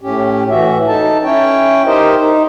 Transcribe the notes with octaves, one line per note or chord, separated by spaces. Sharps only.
A2 C#4 G4
A2 E3 F#4 E5
D#4 A4 A5
C#4 E4 C#5 G5
D#4 G4 A#4 C5 D#5
D#4